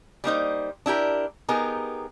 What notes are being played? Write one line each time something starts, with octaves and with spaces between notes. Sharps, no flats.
G3 A#3 D#4 C5
D4 E4 G4 A#4
B3 D#4 G4 G#4 A#4